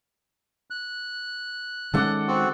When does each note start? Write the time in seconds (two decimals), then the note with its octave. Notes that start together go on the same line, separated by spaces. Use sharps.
0.70 F#6
1.94 D#3 G#3 C#4 A4 F#5 D6
2.28 C4 F#4